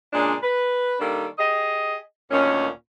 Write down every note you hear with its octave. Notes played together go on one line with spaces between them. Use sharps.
A#2 C#3 G#3 D4
B4
D#3 G3 A#3 D4 A4
G4 G#4 D#5
D2 A#2 D#3 C#4